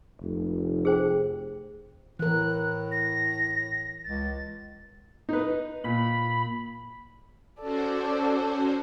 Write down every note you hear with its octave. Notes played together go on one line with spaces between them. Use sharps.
F1
G#4 C5 G5
A2 E3 A#4 F#6
A#6
C#2 A6
D#4 B4
A#2 B5
C#4 F#4 A4 C5 D5